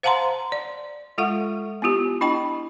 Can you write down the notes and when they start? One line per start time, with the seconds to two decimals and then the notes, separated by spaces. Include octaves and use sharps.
0.03 C5 F5 F#5 A5 A#5 C6
0.52 D5
1.18 G#3 F4 A4 E5 F#5 C#6
1.82 B3 E4 F4 G4
2.21 D4 E4 D#5 G5 A5 B5